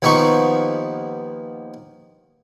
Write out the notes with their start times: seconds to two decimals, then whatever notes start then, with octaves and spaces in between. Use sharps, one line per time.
0.02 D#2 F3 B3 D#4 C#6